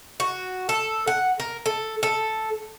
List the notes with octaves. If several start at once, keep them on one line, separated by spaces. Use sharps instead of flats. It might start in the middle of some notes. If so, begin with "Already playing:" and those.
F#4
A4
F#5
A#4
A4
A4